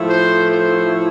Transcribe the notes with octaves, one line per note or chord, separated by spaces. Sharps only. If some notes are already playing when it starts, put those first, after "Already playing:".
Already playing: A2 F3 A3 E4
C5
C5